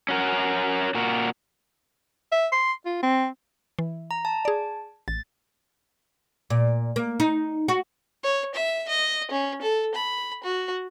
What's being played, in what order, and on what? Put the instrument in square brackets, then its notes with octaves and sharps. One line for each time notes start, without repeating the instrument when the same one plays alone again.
[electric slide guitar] C#4 F#4 A#4
A#2 F#4 A#4
[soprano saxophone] E5
C6
F4
C4
[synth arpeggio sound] E3
[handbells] A#5
A5
[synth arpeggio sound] G#4 D5
[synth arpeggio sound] A1 [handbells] A6
[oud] A#2
A#3
D#4
F#4
[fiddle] C#5
E5
D#5
C#4
A4
B5
F#4